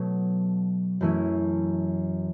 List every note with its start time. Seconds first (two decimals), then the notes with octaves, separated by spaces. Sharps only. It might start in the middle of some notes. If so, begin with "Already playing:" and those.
Already playing: B2 F#3 A3
1.01 F#2 E3 A3 C#4 E4